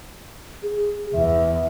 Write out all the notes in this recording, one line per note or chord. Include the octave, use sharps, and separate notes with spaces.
G#4
E2 E5